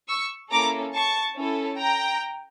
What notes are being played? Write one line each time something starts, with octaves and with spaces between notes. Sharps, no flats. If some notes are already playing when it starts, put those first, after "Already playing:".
C#6 E6
A#3 C#4 E4 A4 A#5 D6
A5 C#6
C#4 E4 A4
G5 A#5